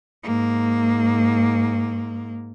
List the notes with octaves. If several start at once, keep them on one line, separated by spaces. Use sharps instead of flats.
G#2 A#3